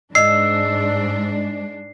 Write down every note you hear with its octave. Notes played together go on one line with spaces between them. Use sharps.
G#2 D4 D5 D#5 E6 C7